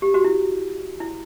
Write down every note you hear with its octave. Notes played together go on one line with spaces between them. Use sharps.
G4
F#4
E4
E4